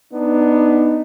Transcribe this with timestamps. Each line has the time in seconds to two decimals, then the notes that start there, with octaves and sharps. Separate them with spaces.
0.14 B3 D4 D#4